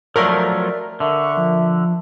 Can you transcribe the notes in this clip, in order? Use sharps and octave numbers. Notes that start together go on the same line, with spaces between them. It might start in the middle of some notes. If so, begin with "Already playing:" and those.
F3 F#3 A3 A#4 D5
D3 E5 C#6
F3